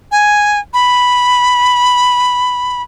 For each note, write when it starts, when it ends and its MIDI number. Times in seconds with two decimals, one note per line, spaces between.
0.11 0.60 80
0.74 2.82 83